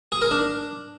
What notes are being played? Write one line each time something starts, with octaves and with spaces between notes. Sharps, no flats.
G#4
A#4
D4